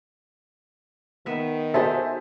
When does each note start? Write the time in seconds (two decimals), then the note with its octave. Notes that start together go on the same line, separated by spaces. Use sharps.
1.26 D#3 B3 E5
1.74 D#4 F#4 G#4 A4 C5 E5